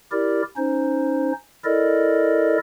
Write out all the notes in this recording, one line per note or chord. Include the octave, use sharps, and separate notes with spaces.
E4 G4 A#4 D5
C#4 D#4 C5
E4 A4 A#4 D5 D#5